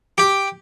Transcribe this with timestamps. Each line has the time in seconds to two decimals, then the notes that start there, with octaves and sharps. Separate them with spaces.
0.18 G4